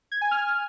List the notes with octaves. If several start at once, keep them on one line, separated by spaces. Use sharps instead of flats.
G#6
G#5
F6